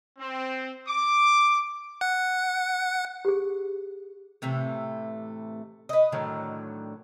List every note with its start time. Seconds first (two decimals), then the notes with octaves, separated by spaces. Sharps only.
0.19 C4
0.87 D6
2.01 F#5
3.25 G4 G#4
4.42 A2 C3 E3 A3
5.89 B4 D#5
6.12 A2 D3 D#3 F#3